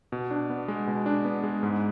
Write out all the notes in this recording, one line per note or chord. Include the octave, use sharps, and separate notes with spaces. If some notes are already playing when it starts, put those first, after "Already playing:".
B2
D4
B3
G#3
B2
D4
B3
G#3
G#2